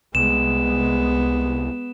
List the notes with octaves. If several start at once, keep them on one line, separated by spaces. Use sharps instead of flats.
C2 G#3 B3 E7